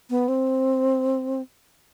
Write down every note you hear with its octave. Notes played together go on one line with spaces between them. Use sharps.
B3
C4